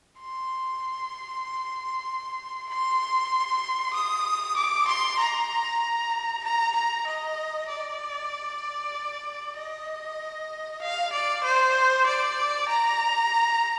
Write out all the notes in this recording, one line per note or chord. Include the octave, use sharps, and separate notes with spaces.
C6
C6
D#6
D6
C6
A#5
A#5
A#5
D#5
D5
D#5
F5
D5
C5
D5
A#5